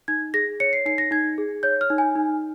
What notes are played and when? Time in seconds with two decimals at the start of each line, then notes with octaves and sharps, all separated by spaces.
0.08 D#4 G#6
0.34 G#4 A#6
0.60 C#5 C#7
0.73 C7
0.86 D#4 C7
0.98 A#6
1.11 D#4 G#6
1.38 G#4
1.63 C#5 G6
1.81 F6
1.90 D#4
1.98 G#5
2.16 D#4